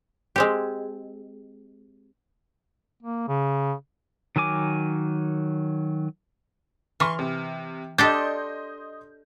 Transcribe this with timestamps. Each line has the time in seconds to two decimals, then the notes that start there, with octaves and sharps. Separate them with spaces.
0.36 G#3 C4 G4
3.03 A#3
3.28 C#3
4.36 D#3 F#3 A#4 G#5 D6
7.00 E3 C6 C#6 F6
7.19 C3
7.98 D4 G4 A4 D#5 C6 G6